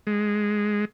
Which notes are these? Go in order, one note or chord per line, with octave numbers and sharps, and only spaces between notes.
G#3